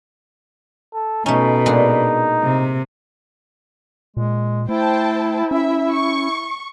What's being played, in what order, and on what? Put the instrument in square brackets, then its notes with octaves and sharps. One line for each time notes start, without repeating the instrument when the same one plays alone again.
[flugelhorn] A4
[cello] B2 [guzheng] A3 C#4 [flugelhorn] D#4
[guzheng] A#2 G#3 D4
[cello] C3
[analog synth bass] A#2 [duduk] G#3
[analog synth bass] A3 [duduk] E4 [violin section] C5 G5 A5
[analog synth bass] C#4 [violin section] E5
[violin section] C#6